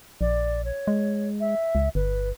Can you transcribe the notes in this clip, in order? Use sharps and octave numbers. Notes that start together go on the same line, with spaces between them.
A#1 D5
C#5
G#3
E5
C#2
G1 B4